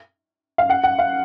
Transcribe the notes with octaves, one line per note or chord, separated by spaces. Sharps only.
F5
F#5
F#5
F5